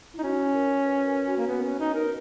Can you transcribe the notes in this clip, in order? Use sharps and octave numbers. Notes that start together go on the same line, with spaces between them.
D#4 E4
C#4 F#4
A#4
B4
A#4
F#4
A#3
B3 F#4
C#4
D#4 B4
A#4